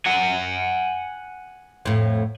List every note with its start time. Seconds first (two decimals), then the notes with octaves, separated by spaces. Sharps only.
0.06 F#5 G#5
1.85 F2 A2